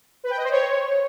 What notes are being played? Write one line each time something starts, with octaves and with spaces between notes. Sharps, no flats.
B4
G5
D#5
C5
C#5